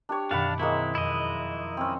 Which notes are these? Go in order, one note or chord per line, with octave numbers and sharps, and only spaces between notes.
D4 G4 C#5
F#2 B2 D#3 D4 D5 F5 F#5 B5
G#3 A#3 C4 E4 C#5
F2 E4 D#5 E5
C4 C#4